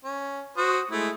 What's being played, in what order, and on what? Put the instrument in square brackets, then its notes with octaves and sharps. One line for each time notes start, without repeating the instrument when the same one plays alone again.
[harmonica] C#4
F#4 C5 D#6
G#3 A3 E4